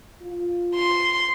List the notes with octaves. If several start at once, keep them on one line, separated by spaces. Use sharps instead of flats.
F4
C6